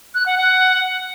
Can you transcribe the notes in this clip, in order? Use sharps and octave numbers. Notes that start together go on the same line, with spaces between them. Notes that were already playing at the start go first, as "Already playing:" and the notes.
F#6
F#5
F#5